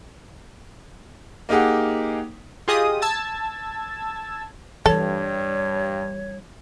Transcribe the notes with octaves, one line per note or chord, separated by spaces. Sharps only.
A#3 D#4 G4 G#4 F#5
F4 G4 G#4 D#5 D#6
A5 E6 G#6 A6
G2 E3 G3 A4 C#5